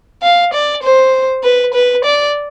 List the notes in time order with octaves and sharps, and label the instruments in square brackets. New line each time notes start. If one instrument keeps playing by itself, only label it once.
[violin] F5
D5
C5
B4
B4
D5